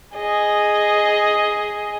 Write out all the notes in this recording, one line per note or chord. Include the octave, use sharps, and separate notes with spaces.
G#4 D#5